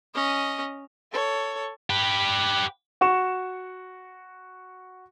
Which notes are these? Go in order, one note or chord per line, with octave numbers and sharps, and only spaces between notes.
C#4 D#5
A4 C#5
G4 B4
F#4 C#6 E7